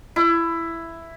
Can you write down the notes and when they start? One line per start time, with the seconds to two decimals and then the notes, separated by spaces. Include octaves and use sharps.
0.16 E4